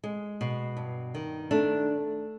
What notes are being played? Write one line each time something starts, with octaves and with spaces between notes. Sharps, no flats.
G#3
B2
G2
D#3
A3 D4